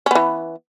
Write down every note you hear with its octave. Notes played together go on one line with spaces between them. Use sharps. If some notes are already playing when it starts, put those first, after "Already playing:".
E3 B3 C#4